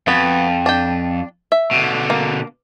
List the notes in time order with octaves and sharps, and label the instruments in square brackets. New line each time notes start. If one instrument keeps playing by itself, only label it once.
[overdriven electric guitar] F2 [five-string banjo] B3 F#4
[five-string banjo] D4 G5
E5
[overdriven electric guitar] B2 D3
[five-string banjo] A#3